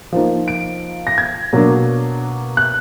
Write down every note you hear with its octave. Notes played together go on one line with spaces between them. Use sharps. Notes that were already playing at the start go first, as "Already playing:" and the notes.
F3 A#3 D#4
D7
A#6
G#6
B2 F#3 A#3 D4
F#6